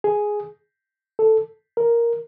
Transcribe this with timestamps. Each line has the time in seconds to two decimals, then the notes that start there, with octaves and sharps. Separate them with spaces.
0.04 G#4
1.19 A4
1.77 A#4